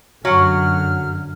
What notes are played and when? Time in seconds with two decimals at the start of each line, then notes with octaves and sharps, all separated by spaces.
0.25 F#2 D3 F#3 F#5 F6